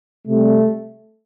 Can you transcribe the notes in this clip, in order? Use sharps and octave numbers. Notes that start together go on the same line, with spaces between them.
C3 G3 A3